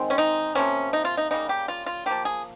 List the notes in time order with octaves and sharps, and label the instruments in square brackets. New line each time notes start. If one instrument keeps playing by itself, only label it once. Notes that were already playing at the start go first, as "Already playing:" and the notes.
Already playing: [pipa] D#3 G#3 C4
C#4
D#4
C3 F3 A#3 C#4
D#4
F4
D#4
C#3 G3 A#3 D#4
G4
F4
F4
F3 A#3 G4
G#4